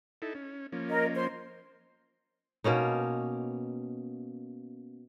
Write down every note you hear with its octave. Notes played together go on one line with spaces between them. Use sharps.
D#4 E4 A4
C#4
F3 A#3 C#4
A#4 D#5
C5 C6
B2 A#3 C#4 D#4